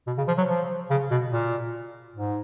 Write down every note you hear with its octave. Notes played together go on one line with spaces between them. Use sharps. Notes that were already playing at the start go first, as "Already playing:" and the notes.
B2
C#3
F3
F#3
F3
C#3
B2
A#2
G#2